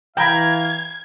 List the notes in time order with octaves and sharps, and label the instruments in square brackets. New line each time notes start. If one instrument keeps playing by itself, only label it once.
[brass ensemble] E3 F5 [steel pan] G5 A#5 B5 [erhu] G#6